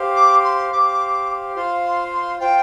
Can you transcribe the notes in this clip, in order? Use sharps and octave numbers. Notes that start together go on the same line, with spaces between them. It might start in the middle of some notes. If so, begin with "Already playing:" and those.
Already playing: G4 C5 F5
D6
C6
G4 C5 F5 D6
F4 C5 F5 C6
C6
C6
F4 C5 F5 G5